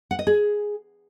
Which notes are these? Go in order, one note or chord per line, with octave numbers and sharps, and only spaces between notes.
F#5
D#5
G#4